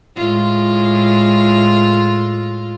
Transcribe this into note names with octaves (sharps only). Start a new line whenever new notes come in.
A2 G#3 F4